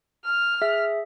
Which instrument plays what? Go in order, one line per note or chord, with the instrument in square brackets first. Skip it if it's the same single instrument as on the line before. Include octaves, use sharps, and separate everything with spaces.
[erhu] F6
[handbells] G#4 E5